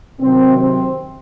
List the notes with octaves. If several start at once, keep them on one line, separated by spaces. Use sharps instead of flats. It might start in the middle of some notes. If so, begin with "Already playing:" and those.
C3 D#3 F#3 C4
C4